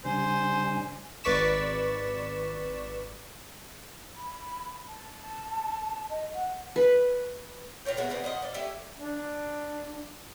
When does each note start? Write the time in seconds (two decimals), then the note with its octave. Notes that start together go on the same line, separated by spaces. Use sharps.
0.05 C#3 G3 D4 C5 G#5
1.24 G#1 B4 D5 C#6 B6 E7
4.16 B5
4.88 A5
6.10 D#5
6.34 F#5
6.76 B4
7.85 A#2 A#4 C#5 G5
7.97 G#3 A3 B3 F#4
8.10 G3 B3 C4 G#4
8.24 A#2 C5 D#5 F#5
8.42 D5
8.54 A3 E4 G4
8.98 D4